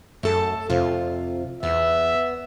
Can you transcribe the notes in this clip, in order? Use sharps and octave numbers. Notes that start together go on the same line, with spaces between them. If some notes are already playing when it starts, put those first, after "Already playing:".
F#2 A3 A4 A5
F2 C3 F4
E2 B3 E5